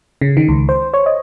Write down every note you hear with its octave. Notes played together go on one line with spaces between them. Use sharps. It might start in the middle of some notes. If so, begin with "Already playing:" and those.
C#3
D#3
C#2
C5
C#5
D#5